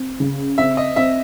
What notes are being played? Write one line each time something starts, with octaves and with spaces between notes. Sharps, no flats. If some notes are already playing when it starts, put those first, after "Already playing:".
Already playing: C4
C#3
C4 E5
D#5
C4 E5